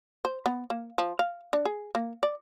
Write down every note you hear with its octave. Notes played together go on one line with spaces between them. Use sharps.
C5
B3
A#3
F3
F5
D4
G#4
A#3
D5